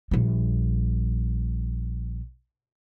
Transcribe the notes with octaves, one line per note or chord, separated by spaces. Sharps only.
A#1 G3